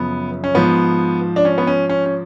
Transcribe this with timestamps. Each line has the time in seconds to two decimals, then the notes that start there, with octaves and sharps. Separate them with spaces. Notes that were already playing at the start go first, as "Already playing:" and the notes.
Already playing: F#2 C#3 F3 B3
0.44 C#4
0.55 G#2 F3 B3
1.36 D4
1.45 C#4
1.58 B3
1.67 C#4
1.89 C#4
2.06 C#4